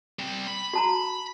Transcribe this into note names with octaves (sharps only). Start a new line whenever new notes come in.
G3 C4
B5
F#4 A5 A#5